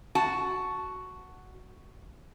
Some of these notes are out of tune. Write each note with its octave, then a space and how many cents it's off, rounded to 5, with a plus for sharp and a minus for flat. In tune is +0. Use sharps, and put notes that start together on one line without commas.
F#4 +0 A5 +0